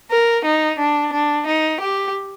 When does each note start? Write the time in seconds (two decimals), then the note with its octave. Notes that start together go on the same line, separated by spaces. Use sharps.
0.10 A#4
0.44 D#4
0.78 D4
1.13 D4
1.46 D#4
1.80 G4